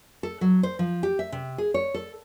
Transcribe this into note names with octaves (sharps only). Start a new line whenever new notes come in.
A4
F#3
C5
F3
G4
E5
C3
G#4
C#5
A4